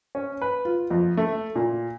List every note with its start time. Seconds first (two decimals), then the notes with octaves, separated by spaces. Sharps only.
0.15 C#4
0.41 B4
0.65 F4
0.90 F2
1.17 A3
1.55 A#2